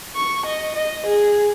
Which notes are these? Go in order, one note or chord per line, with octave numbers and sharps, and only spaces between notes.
C#6
D#5
D#5
G#4